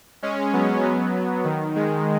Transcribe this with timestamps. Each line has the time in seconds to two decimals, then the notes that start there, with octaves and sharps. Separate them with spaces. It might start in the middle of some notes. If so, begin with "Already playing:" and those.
0.23 G#3 C#4
0.53 F#3 B3
0.84 F#3 B3
1.15 F#3
1.44 D#3
1.75 D#3 G#3